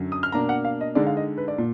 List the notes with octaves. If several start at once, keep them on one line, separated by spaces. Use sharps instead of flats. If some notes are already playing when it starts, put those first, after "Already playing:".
Already playing: F#2 D3 F#3
D#6
F6
B2 A#3 D4 A#5
F#5
F5
D#5
D3 G#3 D#4 D5
F5
D#5
B4
D5
A#2